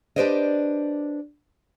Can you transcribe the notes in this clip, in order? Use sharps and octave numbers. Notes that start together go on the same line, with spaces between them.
D4 G4 B4 C5 D5 D#5